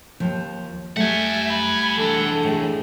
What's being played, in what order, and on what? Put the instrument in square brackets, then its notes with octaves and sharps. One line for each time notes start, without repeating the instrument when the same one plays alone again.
[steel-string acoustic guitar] D#2 F3
[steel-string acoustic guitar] G3 A3 [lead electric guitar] E5 [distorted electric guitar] F#5 G#5
[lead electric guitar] B5
[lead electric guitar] E3 D4 [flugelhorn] A4
[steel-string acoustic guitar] A2 G#4